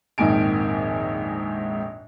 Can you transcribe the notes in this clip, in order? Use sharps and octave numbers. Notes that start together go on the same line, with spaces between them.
A#1 F2 G#2 D#3 G#5 D7